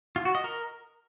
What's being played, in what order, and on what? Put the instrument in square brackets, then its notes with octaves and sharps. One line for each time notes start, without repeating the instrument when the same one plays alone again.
[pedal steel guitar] F4
F#4
D#5
A#4